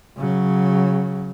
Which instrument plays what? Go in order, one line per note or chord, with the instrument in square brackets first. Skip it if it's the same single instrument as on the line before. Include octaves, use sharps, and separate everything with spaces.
[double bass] C#3 F#3